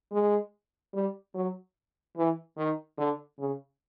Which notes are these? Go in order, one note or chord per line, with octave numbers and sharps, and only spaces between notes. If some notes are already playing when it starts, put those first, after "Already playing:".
G#3
G3
F#3
E3
D#3
D3
C#3